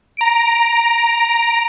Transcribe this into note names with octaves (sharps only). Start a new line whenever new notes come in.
A#5 D7